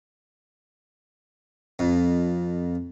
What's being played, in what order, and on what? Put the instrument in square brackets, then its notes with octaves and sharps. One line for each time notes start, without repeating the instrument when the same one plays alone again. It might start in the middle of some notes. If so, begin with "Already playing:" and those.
[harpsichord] F2